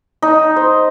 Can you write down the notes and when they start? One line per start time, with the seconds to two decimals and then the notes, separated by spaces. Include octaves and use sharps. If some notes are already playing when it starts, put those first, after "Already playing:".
0.22 D#4
0.56 C5